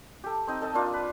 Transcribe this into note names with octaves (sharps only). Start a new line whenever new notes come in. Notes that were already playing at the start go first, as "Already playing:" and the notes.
G4 A4
C4 D#4 D#5
A4 D#5 A5
A#3 D4 F4 F5
B4